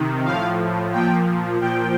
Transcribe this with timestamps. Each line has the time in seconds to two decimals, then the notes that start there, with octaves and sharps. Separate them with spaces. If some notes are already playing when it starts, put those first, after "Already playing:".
Already playing: C3 D#3
0.25 A2 F3 F5
0.93 A#2 F3 G5
1.61 A#2 F3 G5